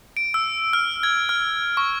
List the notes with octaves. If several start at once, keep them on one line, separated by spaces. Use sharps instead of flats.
D7
E6
F6
G#6
F6
C#6